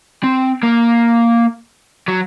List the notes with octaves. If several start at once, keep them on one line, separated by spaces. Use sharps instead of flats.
C4
A#3
F#3